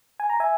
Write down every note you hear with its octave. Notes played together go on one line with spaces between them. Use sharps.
G#5
A#5
E5 G#5